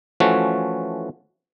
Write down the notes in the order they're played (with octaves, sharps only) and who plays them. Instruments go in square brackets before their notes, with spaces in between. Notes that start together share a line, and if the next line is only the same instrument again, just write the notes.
[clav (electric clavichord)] E3 F3 A3 C#4 F#4